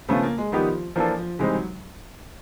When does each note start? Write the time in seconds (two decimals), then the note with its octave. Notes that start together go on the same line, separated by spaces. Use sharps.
0.08 C#3 F3 A3 B3 C#4 F4
0.23 A#3
0.38 G#3
0.52 D#3 F3 G3 B3 D#4 G4
0.96 E3 F3 A#3 D4 F4 A4
1.18 F3
1.39 C3 E3 G3 G#3 C4 D#4
1.53 F#3